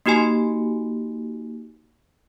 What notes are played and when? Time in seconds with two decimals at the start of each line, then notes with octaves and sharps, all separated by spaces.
0.06 A#3 D#4 F#4 G4 G#5